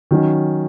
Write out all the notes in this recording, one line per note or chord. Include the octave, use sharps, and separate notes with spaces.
D#3 F#3 C#4